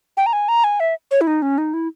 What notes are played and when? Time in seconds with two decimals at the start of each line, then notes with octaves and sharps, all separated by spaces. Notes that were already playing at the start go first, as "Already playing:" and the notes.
0.17 G5
0.26 A#5
0.33 G#5
0.48 A#5
0.64 G#5
0.80 E5
1.11 C#5
1.21 E4
1.27 D#4
1.42 C#4
1.58 D#4
1.74 E4